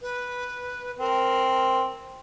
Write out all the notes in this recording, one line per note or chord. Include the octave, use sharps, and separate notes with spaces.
B4
C4 A#4